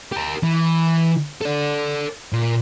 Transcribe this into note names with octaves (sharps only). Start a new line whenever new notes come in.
G4 A#4
E3
A4 D5
A#2